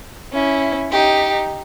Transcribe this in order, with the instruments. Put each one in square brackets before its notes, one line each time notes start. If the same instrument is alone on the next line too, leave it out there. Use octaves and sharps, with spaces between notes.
[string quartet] C#4 E4
D#4 G4